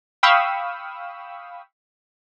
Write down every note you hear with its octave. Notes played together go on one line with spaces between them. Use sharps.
F5 G5 B5 C#6 D#6 E6